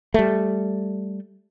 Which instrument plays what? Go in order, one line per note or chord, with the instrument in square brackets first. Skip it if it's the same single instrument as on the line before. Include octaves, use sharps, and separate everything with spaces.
[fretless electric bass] G3 A3